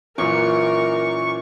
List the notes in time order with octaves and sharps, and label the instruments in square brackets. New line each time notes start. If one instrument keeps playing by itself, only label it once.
[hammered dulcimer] F#2 [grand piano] A#2 E3 [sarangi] A#4 [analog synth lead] C#6